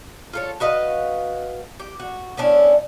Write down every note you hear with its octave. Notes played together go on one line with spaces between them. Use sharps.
F4 A4 C#5
F#4 B4 D#5 F5
G4
F#4
B3 C#4 D4 E4